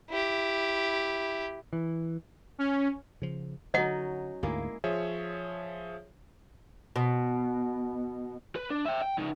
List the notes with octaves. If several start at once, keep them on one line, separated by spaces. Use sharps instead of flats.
E4 G4
E3
C#4
C#3 F3
D3 F#3 C#4 D#4 D#5 F#5
D2 G#2 G#3 A#3 E4
F3 G#4 C#5 E5
B2
B4
D4
E5 G5
G5
C#3 D#4